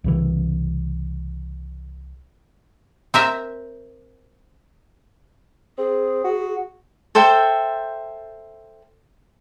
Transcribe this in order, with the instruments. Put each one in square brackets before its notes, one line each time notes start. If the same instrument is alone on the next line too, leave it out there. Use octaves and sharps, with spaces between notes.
[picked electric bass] C2 C#3 E3
[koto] C4 A#4 E5
[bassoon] C4 [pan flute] G#4
[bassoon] F#4
[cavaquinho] A4 C5 E5 G5